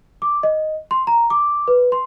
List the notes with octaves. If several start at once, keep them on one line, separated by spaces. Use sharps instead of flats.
D6
D#5
C6
A#5
D6
B4
C6